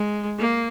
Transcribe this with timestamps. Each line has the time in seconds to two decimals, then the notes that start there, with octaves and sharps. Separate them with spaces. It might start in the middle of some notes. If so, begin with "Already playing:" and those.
Already playing: G#3
0.39 A#3